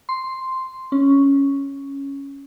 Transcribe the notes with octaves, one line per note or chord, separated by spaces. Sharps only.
C6
C#4